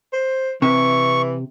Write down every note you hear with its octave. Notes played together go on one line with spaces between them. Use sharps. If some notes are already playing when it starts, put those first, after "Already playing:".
C5
C3 E3 C#6